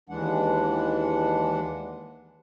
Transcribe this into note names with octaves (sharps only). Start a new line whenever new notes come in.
D#2 E3 G#3 D4 F#5